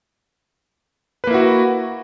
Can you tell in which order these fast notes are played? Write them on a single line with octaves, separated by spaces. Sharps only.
B4 A#3 E4 F#4